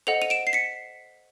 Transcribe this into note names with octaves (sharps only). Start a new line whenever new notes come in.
A4 C5 D#5 F#5 F7
D#7 F7
D7 E7
C7
B6 C#7